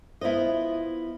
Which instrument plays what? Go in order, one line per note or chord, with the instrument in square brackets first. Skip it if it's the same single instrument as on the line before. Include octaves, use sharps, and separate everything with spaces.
[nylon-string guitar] B3 E4 F4 C5 D#5